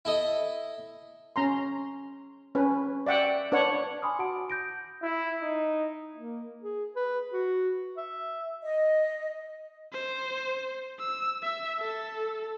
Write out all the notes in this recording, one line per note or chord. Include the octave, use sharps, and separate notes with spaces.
E4 A4 D#5
C#4 A#5 C6
C#4 B4
D5 E5 F#5 G5
D4 B4 C#5 F#5
G#5 B5 C6 D6 D#6 F6
F#4 F#5 A5 D7
D6 G6 A#6 D7
E4
D#4
A#3
G#4
B4
F#4
E5
D#5
C5
E6
E5
A4